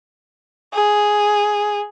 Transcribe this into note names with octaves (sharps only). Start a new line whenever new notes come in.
G#4